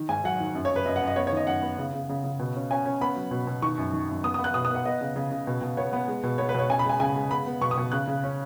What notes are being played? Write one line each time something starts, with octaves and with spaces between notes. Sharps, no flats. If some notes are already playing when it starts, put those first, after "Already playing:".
Already playing: D#3
G#2 G#5
F#3 F#5
D#3
F#2
C#5
F#2
B4
F#2 D#5
F#5
F#2
D#5
B3 C#5
C#5
D#3 D#5
F#2 F#5
B3
C#3
C#3
C#3
C#3
B2
C#4
C#4 G#5
C#4
B3 B5
F#3
B2
B2
D#3 C#6
F#2
D#3
F#2
B3 D#6
D#6
B3
F#6
B2 D#6
D#6
B3
F#5
B3 D#5
C#3
C#3
C#3
B2
B2
B3 C#5
B3
G#3
B2
B3 C#5
B4
B2 C#5
C#4 G#5
B5
G#3 G#5
C#3 G#5
G#3
B3 B5
B3
B2 C#6
D#6
B2
C#3 F#6
C#3
C#4